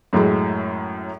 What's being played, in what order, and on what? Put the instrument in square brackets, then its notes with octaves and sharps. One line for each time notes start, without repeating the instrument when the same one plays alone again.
[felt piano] F#2 A2 F#3 G#3